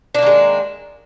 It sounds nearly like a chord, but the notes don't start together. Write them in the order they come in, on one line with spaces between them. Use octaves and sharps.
D4 A#3 D#3 G#3